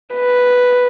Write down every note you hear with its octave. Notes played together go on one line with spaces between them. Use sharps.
B4